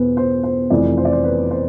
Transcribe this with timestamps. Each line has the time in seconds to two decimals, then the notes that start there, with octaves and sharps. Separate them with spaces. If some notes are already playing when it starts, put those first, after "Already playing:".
Already playing: E2 B2 B4 C5
0.17 C5
0.43 C5
0.70 F1 F2 E3 D5
0.97 C5
1.05 D5
1.12 C5
1.24 B4
1.51 C5